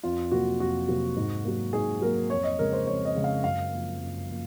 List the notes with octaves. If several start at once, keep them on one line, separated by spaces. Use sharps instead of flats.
F2 F4
C3 F#3 A#3 F#4
F2 F#4
C3 F#3 A#3
G#2
F#3 A#3
G#2 G#4
F#3 A#3 A#4
F2 C#5
D#5
C#3 G#3 A#4
C5
F2 C#5
D#5
C#3 G#3
F5
F#2 F5
F3 A#3
F#2
F3 A#3